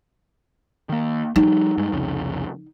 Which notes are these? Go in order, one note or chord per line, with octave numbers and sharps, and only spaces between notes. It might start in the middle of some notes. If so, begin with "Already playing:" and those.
D#3 A#3
F3 G3 D#4
G2 G#3
C2 F2 C#3